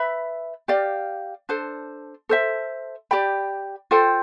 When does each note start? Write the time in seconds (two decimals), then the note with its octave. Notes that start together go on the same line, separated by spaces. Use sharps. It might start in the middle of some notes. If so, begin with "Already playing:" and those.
Already playing: B4 E5 B5
0.68 G4 D5 F5
1.49 D4 A4 C5
2.29 A4 C5 E5
3.11 G4 D5 G5 B5
3.91 F4 A4 C5 G5